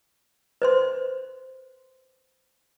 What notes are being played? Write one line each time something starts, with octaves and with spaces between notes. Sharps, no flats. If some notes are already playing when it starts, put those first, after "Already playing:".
B4 C5 C6